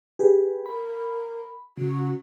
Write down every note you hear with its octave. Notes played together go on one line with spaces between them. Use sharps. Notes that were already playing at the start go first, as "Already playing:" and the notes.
G4 G#4 B4
A#4 B5
C#3 F#4